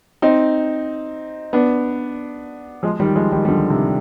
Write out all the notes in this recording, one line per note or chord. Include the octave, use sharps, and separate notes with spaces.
C4 D#4
B3 D4
F3 G#3
D#3 G3
F3 G#3
D#3 G3
G3
D3 F3
C3 D#3